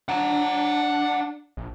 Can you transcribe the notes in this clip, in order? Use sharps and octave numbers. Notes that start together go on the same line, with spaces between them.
D4 F#5 A#5
A#1